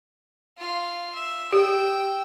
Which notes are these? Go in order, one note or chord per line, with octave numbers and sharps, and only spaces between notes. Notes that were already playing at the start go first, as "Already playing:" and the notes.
F4 F5
E5
G4 G5 E6